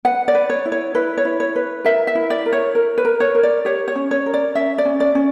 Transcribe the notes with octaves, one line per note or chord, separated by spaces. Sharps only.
B4 F#5
D5
B4
C#5
E4
C#5
E4 B4
C#5
E4
C#5
B4
A#4 E5
E5
E4
D5
A#4
C#5
A#4
B4
A#4
C#5
A#4
D5
G4 C#5
C#5
C#4
C#5
A#4
D5
C#4 E5
D5
C#4
D5
C#4